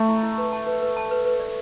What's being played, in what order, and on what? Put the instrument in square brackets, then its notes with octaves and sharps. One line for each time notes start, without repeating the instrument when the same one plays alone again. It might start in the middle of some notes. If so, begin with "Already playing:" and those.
Already playing: [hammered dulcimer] A3
[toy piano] E4
E4
B4
A5
B4
B4
A5
B4
B4
D5